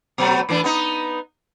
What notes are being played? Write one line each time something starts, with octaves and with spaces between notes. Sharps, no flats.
B2 F#3 A3
A2 E3 D4
B3 D#4